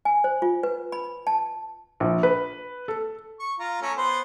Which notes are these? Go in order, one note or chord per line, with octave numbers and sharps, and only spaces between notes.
G#5
C5
F4
B4
B5
A5
A#1
B4
A4
C#6
F4 A#5
A3 C#4 A#4
B3 C5 C6